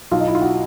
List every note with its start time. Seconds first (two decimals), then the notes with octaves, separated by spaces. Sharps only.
0.11 B1 F4
0.20 D#4
0.28 E4
0.35 F4
0.42 F#4